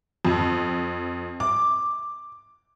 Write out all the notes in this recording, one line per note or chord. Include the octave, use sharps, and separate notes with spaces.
F2
D6